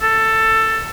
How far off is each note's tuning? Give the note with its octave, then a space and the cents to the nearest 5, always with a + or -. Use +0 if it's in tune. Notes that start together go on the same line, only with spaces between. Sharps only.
A4 +15